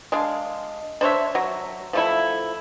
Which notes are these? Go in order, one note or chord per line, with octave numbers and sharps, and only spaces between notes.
G#3 D4 F5
D4 C5 C#5 E5
F#3
F3 A3 E4